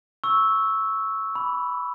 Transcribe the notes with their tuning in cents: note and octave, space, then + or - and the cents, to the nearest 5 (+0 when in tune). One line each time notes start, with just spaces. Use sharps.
C#6 +0 E6 -5
B5 +0 D6 -45